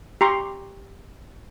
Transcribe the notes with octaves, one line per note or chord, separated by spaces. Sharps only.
G4 A#5 C6 C#6